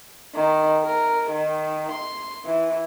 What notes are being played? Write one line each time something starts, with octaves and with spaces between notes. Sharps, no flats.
D#3
A#4
D#3
C6
E3